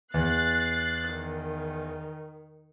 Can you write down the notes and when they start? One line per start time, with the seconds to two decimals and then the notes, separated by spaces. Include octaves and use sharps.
0.14 E2 F#6 A6 C7
1.10 D#3